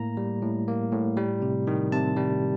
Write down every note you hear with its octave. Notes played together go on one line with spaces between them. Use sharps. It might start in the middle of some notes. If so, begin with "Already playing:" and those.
Already playing: A2 A#3 A#5
G3
A2
A#3
A2
G3
C3
D#3
C3 A5
G3